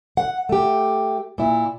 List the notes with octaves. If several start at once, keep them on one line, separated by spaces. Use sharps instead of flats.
F#5
A3 G4
A#2 E4